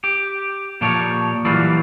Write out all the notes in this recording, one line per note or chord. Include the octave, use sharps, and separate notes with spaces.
G4
A#2 F3 G4 A4 C#5
E3 F#3 G3 A#3 F4